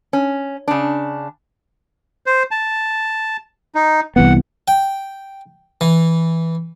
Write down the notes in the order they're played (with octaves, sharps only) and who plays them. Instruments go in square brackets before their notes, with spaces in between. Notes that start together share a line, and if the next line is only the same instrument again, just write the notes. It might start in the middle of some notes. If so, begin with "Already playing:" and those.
[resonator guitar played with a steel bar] C#4
C#3 D4
[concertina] C5
A5
D#4
[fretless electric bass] C2 E3 B3 [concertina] F#5
[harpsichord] G5
E3